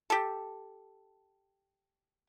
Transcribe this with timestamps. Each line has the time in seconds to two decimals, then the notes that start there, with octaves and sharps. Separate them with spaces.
0.10 G4 A4